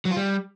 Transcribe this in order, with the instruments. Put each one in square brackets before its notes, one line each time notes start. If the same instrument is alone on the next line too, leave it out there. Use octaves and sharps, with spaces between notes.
[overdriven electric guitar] F#3
F4
G3